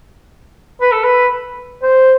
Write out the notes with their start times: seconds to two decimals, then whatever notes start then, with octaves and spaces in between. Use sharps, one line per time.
0.81 B4
0.92 A4
1.04 B4
1.82 C5